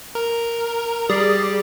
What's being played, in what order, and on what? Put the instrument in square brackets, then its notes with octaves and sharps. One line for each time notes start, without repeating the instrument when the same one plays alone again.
[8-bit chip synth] A#4
[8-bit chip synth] G3 [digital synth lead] G#4 [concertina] D5